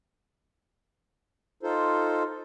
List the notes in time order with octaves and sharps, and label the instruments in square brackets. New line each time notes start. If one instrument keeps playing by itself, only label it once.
[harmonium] D#4 F4 A4 C5